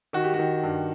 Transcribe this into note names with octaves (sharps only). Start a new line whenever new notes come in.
D#3 F#4
G4
F#4
D#3
G2